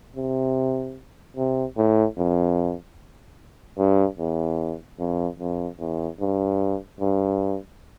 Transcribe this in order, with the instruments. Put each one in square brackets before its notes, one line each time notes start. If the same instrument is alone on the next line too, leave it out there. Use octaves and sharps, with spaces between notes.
[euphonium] C3
C3
A2
F2
G2
E2
F2
F2
E2
G2
G2